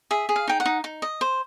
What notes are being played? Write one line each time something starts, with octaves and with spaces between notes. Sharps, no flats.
G#4 E5
G#4
F5
D#4 G5
F#5
D#4
D#4
D#5
C5